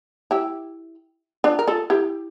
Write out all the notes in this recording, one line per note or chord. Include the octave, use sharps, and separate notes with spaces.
E4 G4
D4 F4
A#4
F4 A4
E4 G4